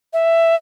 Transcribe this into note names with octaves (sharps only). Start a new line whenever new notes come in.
E5